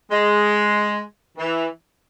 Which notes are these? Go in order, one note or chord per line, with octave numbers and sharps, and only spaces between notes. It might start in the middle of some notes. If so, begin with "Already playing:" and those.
G#3
E3